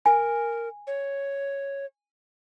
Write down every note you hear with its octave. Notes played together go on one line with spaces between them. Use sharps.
A#4 G#5
C#5